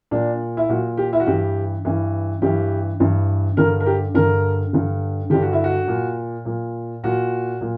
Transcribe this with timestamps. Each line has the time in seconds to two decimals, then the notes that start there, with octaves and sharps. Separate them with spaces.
0.11 A#2 D4
0.57 E4
0.69 A#2 F#4
0.97 G4
1.13 E4
1.20 F#4
1.26 G2 E3 G4
1.85 G2 E3
2.42 G2 E3 G4
3.00 G2 E3
3.57 G2 D3 A#4
3.80 A#4
3.86 G4
4.15 G2 D3 A#4
4.73 G2 D3
5.30 G2 D3 G4
5.42 F#4
5.53 E4
5.64 F#4
5.88 A#2
6.45 A#2
7.04 A#2 F#4
7.61 A#2